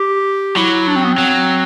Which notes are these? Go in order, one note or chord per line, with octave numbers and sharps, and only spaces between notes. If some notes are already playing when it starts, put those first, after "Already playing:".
Already playing: G4
F#3 E4
D4
C4
B3
C4
F#3